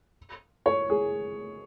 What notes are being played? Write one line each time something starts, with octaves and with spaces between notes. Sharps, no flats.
C#5
G#4